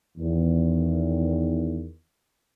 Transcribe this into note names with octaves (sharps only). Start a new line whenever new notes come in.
E2 D#3